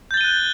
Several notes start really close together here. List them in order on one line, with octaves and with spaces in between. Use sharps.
G6 A6 G7 D#7 F#6